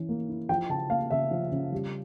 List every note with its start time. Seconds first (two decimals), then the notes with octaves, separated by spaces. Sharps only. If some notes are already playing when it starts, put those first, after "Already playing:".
Already playing: E3 C#4
0.09 A#3
0.29 E4
0.49 F3 G5
0.69 C#3 A5
0.90 A#3 F5
1.10 C#3 E5
1.31 F3
1.52 C#3
1.72 G3